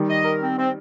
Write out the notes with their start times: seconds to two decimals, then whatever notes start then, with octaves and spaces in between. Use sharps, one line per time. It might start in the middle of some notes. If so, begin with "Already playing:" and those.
Already playing: D#3 G3
0.09 D#5
0.24 A#4
0.41 C4
0.58 C4